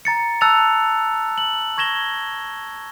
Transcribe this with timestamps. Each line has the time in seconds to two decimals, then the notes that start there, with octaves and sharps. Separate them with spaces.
0.05 A#5 A6 C#7
0.41 A5 E6 F#6 A6 C#7 F7
1.38 F#7
1.77 C#6 G#6 A#6 E7 G7